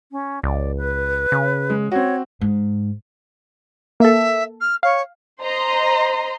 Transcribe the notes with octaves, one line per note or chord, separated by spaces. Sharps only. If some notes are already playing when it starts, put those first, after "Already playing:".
C#4
C#2 D5
B4
C#3
G#3
C4 F#4 C#5
G#2
A#3 A4 E5
F6
C#5 F5
C5 D#5 A#5 C6